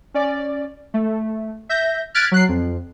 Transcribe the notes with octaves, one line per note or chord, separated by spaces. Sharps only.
C#4 D5
A3
E5 G6 A#6
F6 F#6 G#6 A6 B6 D7
F#3 F#6 C7
F2